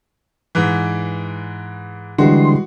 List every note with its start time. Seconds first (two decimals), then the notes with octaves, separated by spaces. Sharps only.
0.55 G#2 E3
2.18 D3 E3 G3 G#3 F#4 C6